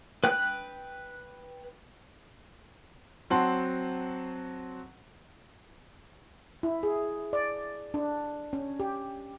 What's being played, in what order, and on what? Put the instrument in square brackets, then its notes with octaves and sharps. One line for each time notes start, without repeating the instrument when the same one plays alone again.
[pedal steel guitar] B4 G5 F#6
[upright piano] F#3 C4 F#5 A5 C6
[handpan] E4
G#4
D5
D4
C#4
G4